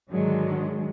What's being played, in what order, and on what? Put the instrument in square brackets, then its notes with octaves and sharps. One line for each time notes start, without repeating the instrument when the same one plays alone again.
[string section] G#2 D3 D#3 F#3 G#3